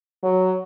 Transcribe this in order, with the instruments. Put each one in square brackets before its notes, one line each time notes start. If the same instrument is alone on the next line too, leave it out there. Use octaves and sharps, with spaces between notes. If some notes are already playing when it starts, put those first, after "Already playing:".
[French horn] F#3